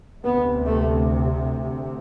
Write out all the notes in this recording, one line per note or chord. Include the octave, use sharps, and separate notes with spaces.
D2 C3 B3
A3